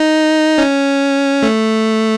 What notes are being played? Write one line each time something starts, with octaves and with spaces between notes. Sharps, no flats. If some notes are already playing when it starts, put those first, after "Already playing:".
Already playing: D#4
C#4
A3